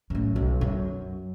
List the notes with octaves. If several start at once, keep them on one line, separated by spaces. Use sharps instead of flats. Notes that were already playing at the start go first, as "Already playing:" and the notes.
A1 F#2
B1
F#2